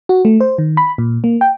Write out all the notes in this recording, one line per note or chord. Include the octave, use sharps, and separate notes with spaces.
F#4
A3
C5
D#3
B5
A#2
A#3
G5